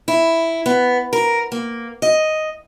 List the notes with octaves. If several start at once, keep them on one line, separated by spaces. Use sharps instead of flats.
E4
B3
A#4
A#3
D#5